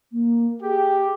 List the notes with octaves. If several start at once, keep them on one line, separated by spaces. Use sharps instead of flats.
A#3
G4 G#4